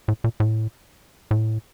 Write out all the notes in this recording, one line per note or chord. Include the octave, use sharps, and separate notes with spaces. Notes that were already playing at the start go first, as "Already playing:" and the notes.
A2
A#2
A2
A2